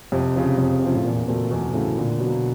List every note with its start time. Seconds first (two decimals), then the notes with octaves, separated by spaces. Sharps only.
0.12 F2 C3
0.35 C#3 F3
0.58 F2
0.82 C#3 F3
0.95 A2
1.04 E2 A#2
1.28 A#2 C#3 F#3 A3 C4
1.51 E2 B2
1.74 A2 C#3 F#3 A3 C4
1.97 A#2 D3
2.20 B2 F#3 A#3